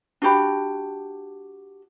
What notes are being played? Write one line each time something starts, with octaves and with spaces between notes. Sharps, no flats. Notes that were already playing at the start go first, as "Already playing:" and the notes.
D4 F#4 G4 B5